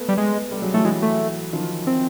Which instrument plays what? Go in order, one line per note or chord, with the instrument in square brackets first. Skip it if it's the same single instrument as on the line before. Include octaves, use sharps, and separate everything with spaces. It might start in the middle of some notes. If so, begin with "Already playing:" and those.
Already playing: [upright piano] A3 B3
[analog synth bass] G3
G#3
[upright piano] G3 A3
F#3 G#3
[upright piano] E3 F#3 [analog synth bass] A3
[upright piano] E3 F#3 [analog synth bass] G#3
[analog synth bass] A3
[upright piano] D#3 F3
[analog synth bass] C4